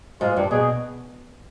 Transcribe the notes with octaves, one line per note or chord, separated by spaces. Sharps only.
G#2 F4
G2
B2 G#4